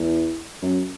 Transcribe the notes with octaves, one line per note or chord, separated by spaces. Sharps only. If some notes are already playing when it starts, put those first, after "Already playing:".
Already playing: E2
F#2